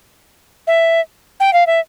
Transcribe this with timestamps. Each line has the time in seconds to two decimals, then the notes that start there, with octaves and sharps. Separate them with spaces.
0.67 E5
1.40 G5
1.53 F5
1.67 E5